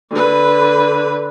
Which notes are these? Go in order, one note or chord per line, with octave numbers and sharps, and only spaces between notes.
D3 B4